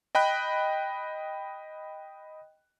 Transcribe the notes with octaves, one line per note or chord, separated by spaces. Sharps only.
D#5 G5 B5 F#6